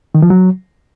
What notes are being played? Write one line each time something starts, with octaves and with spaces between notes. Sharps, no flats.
D#3
F3
F#3